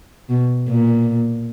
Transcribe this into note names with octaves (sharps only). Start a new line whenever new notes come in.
B2
A#2